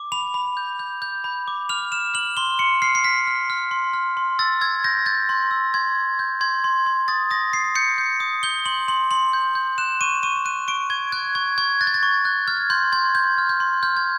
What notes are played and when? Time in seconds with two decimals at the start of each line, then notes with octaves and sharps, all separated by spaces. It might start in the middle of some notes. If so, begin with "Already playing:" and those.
Already playing: D6
0.12 B5 F7
0.34 B5
0.57 G6
0.79 G6
1.02 G6
1.24 B5
1.48 D6
1.69 F6 F7
1.92 F6 E7
2.14 F6 F#7
2.37 C6 G7
2.59 C6 C#7
2.82 F6 C7
2.95 C7
3.04 F6 B6
3.27 F6
3.50 F6
3.71 C6
3.94 F6
4.17 C6
4.39 E6 A6
4.61 E6 G#6
4.84 G6 A#6
5.06 G6 A6
5.29 C6
5.51 E6
5.74 C6 G#6
5.96 C6
6.19 G6
6.41 C6 G#6
6.64 C6
6.86 C6
7.08 D#6 A6
7.31 D#6 A#6
7.53 D#6 C7
7.75 G6 C#7
7.98 G6
8.20 D#6
8.43 G6 G7
8.66 C6 F#7
8.88 C6 F#7
9.11 C6 F#7
9.33 G6
9.55 G6
9.78 F#6 E7
10.01 C#6 D#7
10.23 C#6 D#7
10.45 F#6 D#7
10.68 C#6 D7
10.90 C#6 G#6
11.12 F#6 G#6
11.35 C#6 G#6
11.58 C#6 G#6
11.81 F#6 A6
11.87 G#6
11.94 A6
12.03 C#6
12.25 F#6
12.48 F6 G#6
12.70 C6 G6
12.92 C6 G#6
13.15 C6 G6
13.38 F6
13.49 G6
13.60 C6
13.83 F6 G6
13.97 G#6